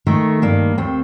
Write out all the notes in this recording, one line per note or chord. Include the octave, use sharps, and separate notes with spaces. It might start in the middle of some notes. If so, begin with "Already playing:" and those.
D#3 A3
G2 A#3
D#2 C4